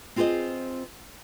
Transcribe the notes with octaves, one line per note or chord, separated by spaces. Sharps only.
C4 F4 G#4 A#4 C5 D#5